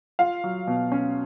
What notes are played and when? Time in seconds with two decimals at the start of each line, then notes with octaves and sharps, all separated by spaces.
0.19 F4 F5
0.44 F#3
0.67 B2
0.92 C#4